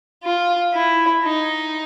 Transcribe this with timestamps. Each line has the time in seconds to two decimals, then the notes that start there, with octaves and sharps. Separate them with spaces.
0.24 F4
0.73 E4
1.23 D#4